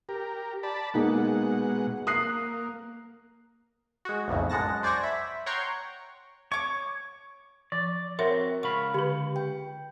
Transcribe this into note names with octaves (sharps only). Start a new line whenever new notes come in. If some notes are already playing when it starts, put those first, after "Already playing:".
G4 A#4
D5 A5 B5
B2 G#3 A#3 D#4 G#4 F#5
A#3 D#6 F#6 C7
G#3 F#4
B1 F2 A2 C#3
F#2 G#3 F#5 A5 A#6
C5 D5 G#5 C#6 A#6
E5 B5
C#5 F#5 G5 A#5 C6 C#6
C#5 C#6 D6
F3 D5
C4 F#4 A#4 C#5 E5 C6
C#2 F5 B5 C#6
D3 G4 B4
G5